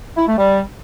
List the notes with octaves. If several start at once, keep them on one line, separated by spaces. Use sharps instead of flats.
E4
A3
G3